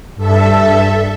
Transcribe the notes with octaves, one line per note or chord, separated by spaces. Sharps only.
G2 A4 E5